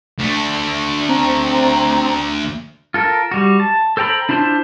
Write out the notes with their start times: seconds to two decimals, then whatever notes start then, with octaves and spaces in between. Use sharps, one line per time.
0.19 D2 A3
1.09 C4 A#5
2.94 F4 A4 A#4
3.32 G3 F#4
3.60 A5
3.97 A4 C5 G5 A#5 B5
4.29 D4 E4 F4 C5 A5